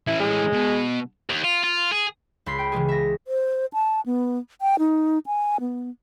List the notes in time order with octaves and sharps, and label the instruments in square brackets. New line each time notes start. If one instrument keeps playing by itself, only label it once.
[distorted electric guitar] E3 C#4 [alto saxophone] E4
[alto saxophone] G#3
[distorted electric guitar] B2
D#2
F4
F4
G#4
[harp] C#2 B5 C6 B6 C7
G5
C#3 E3 G#3 G#4
E5 A#6
[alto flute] C5
A5
B3
G5
D#4
G#5
B3